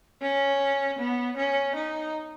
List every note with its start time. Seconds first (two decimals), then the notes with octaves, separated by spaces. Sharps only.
0.22 C#4
0.99 B3
1.37 C#4
1.75 D#4